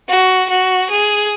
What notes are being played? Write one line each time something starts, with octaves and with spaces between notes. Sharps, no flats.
F#4
F#4
G#4